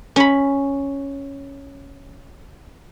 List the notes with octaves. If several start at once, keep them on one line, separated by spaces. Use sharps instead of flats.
C#4 B5